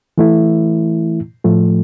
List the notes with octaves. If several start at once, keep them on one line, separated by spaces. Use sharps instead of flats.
E3 A3 E4
A2 F3 A3